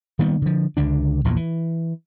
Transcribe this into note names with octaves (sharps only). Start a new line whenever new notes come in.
D#3 G3 A#3 B3
D3 F3
C#2 D3 D4
A#1 E2 G2 A#2
E3